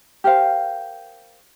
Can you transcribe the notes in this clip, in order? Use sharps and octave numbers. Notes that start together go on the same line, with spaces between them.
G4 A#4 C5 F5